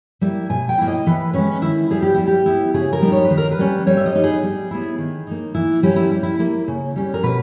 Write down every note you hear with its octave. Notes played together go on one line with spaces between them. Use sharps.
G3 A#3 E4
B2 G#5
G5
A#3 E4
D#5
E3 B4
G#3 C#4 B4
D#3 E4
G3 B3 G#4
G4
G3 E4
G4
B3 E4
C#3 G#4
A#4
G3 B3 D#4
C#5
B4
D#3
A#4
B4
G3 A#3 C#4
G3 C#5
E5
D#5
B3 D#4
G#4
G3
B3 E4
D#3
A#3 D#4
E3 E4
G3 A#3 C#4 E4 G4
E4
G3
E4
A#3 E4
C#3
G3 C#4
A#4
B2 B4